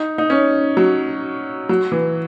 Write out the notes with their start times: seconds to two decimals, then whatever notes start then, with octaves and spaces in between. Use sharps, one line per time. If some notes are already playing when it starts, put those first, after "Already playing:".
Already playing: D#4
0.18 D#4
0.30 C#4
0.77 F#3
1.69 F#3
1.92 E3